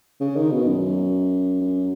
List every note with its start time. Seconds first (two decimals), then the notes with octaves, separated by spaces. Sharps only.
0.20 C#3
0.36 D#3
0.52 B2
0.67 F#2
1.61 F#2